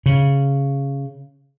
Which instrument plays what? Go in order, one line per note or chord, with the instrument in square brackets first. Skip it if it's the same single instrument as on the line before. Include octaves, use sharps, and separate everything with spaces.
[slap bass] C#3